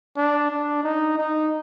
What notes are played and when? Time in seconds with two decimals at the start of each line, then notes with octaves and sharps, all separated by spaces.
0.17 D4
0.50 D4
0.84 D#4
1.18 D#4